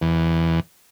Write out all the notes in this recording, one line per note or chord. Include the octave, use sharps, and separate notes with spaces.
E2